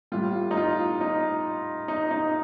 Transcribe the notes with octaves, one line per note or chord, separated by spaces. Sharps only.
A2 G3 F4
D#4
F4
D#4
D#4
D#4